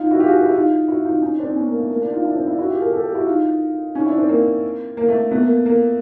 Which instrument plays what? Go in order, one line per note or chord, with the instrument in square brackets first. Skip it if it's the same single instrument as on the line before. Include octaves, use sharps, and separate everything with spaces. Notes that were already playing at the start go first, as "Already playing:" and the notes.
Already playing: [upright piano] D#4 F4
E4 F#4
F4 G4
F#4 G#4
G4
E4 F#4
D#4 F4
E4 F#4
D#4 F4
C#4 D#4
C4 D4
B3 C#4
A#3
A3
A#3
D4 E4
D#4 F4
D4 E4
C4 D4
D4 E4
E4 F#4
F4 G4
G#4 A#4
G4 A4
G4 A4
E4 F#4
D#4 F4
C#4 D#4
D4 E4
C4 D4
A#3 C4
A#3
A3
A3 B3
A#3
A#3